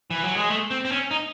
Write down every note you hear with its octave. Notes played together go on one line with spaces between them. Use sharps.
E3
F#3
G#3
A3
C4
C4
C#4
D#4